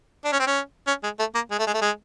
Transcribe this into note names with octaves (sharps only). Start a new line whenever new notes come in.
D4
C#4
C4
C#4
C#4
G#3
A3
A#3
G#3
A3
G#3
A3
G#3